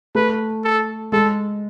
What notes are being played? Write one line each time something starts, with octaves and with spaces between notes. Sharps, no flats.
A3 B4
A4
G#3 A4